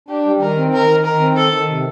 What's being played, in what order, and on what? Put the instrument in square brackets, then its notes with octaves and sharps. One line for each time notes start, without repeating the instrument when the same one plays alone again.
[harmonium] D4 [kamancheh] G4
[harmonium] G3
[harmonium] D#3 [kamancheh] A#4
[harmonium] C4
[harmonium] D#3 [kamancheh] A#4
[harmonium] D#3
[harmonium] D#3 [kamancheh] A#4
[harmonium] C4
[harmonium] D#3 [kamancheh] A4
[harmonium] D#3
C3